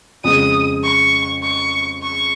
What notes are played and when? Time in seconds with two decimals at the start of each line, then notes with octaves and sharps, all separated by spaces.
0.24 F2 C#3 G#3 D#6
0.83 C#6
1.43 C#6
2.02 C#6